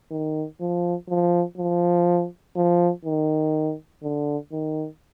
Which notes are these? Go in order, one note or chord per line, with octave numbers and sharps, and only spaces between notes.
D#3
F3
F3
F3
F3
D#3
D3
D#3